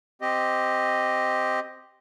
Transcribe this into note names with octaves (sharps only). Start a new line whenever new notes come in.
C4 G4 D#5